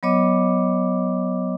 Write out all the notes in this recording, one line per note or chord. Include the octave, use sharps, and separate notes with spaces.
F#3 B3 C#5 D#5 D6